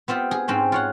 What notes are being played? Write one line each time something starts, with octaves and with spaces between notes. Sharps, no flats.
B3 C4 F4 G4
G#4
G#2 C4 C#4 G4
F4 C#5 F#5